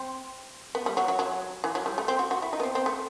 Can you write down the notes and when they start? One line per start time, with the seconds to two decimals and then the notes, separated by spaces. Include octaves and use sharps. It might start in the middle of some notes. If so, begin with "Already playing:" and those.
Already playing: C4
0.75 B3
0.86 G3
0.97 F#3
1.08 F#3
1.19 F#3
1.64 E3
1.75 F#3
1.86 G3
1.98 A3
2.08 C4
2.19 F#4
2.31 F#4
2.42 E4
2.53 D#4
2.60 B3
2.63 C4
2.75 C4
2.86 A3